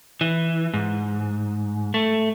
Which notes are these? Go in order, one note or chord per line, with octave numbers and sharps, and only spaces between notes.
E3
G#2
A3